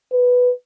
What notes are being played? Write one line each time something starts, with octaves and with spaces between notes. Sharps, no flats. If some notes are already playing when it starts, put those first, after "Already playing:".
B4